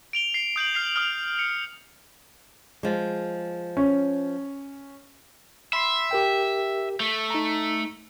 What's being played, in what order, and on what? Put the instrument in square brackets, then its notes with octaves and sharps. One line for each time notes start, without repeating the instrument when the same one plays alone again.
[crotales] D7 F7 G7
C7
D#6 G6 D7 F#7
F6 C7 F7
D#6 F6
C#7
[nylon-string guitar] F3 G#3
[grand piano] C#4
[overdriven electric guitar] E5 [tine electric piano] B5 C6 C7
[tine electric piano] G4 A#4 G5
[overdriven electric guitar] A3
[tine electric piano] D#4 A#5